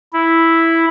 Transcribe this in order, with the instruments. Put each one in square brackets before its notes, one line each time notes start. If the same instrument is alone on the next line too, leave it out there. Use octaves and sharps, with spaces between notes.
[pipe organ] E4